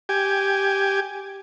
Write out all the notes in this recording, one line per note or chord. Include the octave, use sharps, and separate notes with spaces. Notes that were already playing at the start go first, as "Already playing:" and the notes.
G4 G#5